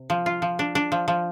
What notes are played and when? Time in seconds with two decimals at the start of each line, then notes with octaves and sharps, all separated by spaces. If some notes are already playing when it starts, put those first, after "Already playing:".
Already playing: C3
0.10 F3
0.26 F4
0.42 F3
0.59 D4
0.75 D4
0.92 F3
1.08 F3